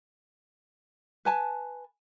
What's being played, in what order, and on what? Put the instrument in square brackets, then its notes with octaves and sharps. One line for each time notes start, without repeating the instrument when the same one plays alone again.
[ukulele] B4 G#5 A5